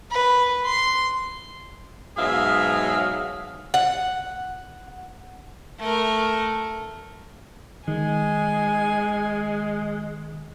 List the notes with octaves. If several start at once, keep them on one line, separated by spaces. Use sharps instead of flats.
B4
C6
G#2 B2 F#3 G#4 E5 F5
F#5
A3 A#4
D#3 G#3 G#5